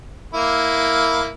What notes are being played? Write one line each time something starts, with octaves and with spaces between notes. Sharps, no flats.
A#3 E4